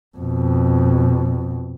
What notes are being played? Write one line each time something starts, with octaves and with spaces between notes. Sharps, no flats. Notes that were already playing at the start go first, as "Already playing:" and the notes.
F2 B2